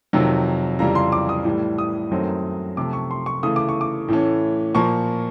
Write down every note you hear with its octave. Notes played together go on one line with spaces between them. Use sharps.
F2 C3 D#3 F#3
F2 C#3 E3 G3 A#5
C6
D6
D#6
A2 E3 G3
D#6
F#2 D#3 F#3 A3 C4
C3 F3 A3 D6
C#6
C6
C#6
C#3 E3 A3 D#6
D6
C#6
D6
A2 E3 A3 C#4
A#2 F3 A#3 C#6